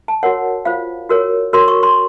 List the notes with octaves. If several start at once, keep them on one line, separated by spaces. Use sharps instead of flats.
A5
F#4 A#4 C#5 F#5
F4 C5 F5
F#4 A#4 C#5
F#4 A#4 C#5 C6
C#6
C6